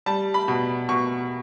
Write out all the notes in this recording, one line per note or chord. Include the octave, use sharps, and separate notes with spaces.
G3 A5
B5
B2
B2 C#6